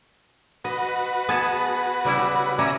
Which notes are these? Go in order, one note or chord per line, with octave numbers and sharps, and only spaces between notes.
F#4 B4 D#5
B3 G#4 A5
C#3 G3 E4
C#4 D5 E5 A#5